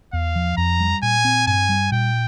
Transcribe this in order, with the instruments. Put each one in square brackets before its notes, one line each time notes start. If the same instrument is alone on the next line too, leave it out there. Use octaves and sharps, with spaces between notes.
[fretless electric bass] E2 [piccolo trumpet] F5
[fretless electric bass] F3
[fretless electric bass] F2 [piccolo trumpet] A#5
[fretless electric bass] G3
[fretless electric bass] A#2 [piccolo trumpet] G#5
[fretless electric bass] C4
[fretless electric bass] G2 [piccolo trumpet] G#5
[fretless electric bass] G3
[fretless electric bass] A#2 [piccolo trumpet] G5